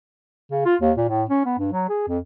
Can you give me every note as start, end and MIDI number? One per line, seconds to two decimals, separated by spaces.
0.51 0.61 49
0.65 0.75 65
0.81 0.92 39
0.97 1.06 46
1.09 1.23 45
1.29 1.41 61
1.45 1.58 59
1.59 1.72 43
1.72 1.85 54
1.89 2.05 68
2.08 2.18 41